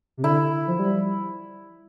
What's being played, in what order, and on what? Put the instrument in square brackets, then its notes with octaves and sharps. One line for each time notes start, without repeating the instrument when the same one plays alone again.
[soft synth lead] C3
[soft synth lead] D3 [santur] E4
[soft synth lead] F3
G3